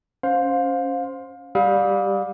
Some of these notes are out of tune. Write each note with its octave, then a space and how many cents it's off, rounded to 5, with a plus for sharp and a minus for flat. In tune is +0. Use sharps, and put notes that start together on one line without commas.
C#4 +0 C5 +0 F5 +25
G3 +0 F5 +30 D#6 +40